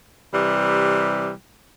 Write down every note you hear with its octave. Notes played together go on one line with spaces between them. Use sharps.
C3 E3 G3